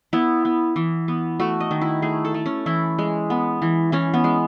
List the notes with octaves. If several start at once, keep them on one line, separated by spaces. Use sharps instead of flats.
B3 E4
B3
E3
B3
A3 F#4
D#5
D#3
E4
A3 G#4
A4
A3
C#4
E3 E4
G#3
B3
E3
E3 C#4
B3
G#3